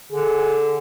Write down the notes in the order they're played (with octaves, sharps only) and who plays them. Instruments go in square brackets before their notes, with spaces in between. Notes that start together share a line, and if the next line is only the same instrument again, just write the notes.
[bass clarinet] D3 [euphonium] G#4